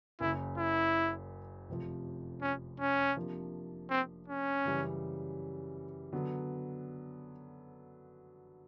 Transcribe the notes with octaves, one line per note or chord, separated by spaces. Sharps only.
F#1 F#2 C#3 E4
E4
F1 F2 C3 F3
C#4
C#4
C3 F3 A#3 D4
C4
C#4
F#2 C#3 E3 G3
D3 F#3 B3